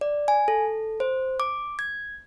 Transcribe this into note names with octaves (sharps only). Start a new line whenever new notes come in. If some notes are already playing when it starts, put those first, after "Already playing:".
D5
G#5
A4
C5
D6
G#6